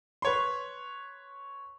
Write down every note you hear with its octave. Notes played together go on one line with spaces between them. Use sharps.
B4 C#5 C6